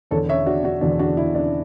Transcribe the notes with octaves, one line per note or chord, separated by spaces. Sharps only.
E1 E2 D3 A4 C#5
C#5 E5
D4 F#4
D4 F#4
E1 E2 D3 D4 F#4
D4 F#4
E4
D4